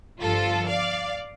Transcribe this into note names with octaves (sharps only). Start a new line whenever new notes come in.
G1 G2 F3 F4 A4
D5 F5